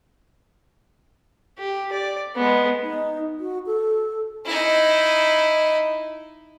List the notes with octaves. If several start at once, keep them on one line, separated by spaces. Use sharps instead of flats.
G4
D5
G#3 B3
D#4
F#4
A4
D#4 E4